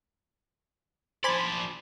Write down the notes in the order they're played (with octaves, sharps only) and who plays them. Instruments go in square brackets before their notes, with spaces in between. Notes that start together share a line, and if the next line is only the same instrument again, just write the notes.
[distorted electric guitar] F3 D5 [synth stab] C5 G#5 B5